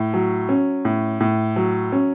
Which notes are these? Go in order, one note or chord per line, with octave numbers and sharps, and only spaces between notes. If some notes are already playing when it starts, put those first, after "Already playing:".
Already playing: A2
F#3
C#4
A2
A2
F#3
C#4